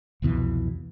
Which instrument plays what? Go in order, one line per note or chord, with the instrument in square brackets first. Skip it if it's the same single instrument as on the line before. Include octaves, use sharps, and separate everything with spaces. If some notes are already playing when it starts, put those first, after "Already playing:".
[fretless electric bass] C2 F2 B2 E3